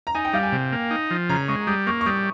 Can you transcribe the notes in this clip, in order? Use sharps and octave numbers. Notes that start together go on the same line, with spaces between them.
A#5
D#4 G#5
G5
G3 F5
G#5
C3
A#3
D#4
F3
C#3 A#5
G#3 C#6
G3 D#6
A#3 C#6
C#6
G3 D#6